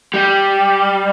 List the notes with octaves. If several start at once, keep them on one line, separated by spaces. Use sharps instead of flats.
G3